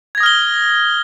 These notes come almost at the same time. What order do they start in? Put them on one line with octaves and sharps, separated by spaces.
G#6 A#6 D#6 F6 G7